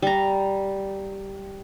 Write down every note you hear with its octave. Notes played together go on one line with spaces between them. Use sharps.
G3 A#5